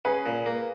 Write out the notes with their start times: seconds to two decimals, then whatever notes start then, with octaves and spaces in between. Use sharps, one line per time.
0.05 C#4 G#4 B4
0.26 A#2
0.46 A#3